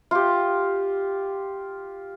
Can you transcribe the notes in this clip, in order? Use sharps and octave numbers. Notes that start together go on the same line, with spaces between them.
F4 G4